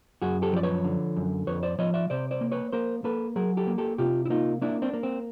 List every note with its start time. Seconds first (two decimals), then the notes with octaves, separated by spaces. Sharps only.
0.22 F#2 F#4 G#4
0.42 G4 A4
0.53 F3 D5
0.63 B4 C#5
0.84 D3
1.16 F#2
1.47 F2 B4 C#5
1.63 C5 D5
1.79 F3 C#5 D#5
1.94 D5 E5
2.10 C3 C5 D5
2.31 C5 D5
2.41 A#3
2.52 B4 C#5
2.72 A#3 A#4 C5
3.04 A#3 A4 B4
3.36 F#3 G#4 A#4
3.57 G4 A4
3.67 A#3
3.78 G4 A4
3.98 C3 F4 G4
4.26 E4
4.30 A#3 D#4 F4
4.62 A#3 D4 E4
4.82 C4 D4
4.93 A#3
5.03 C4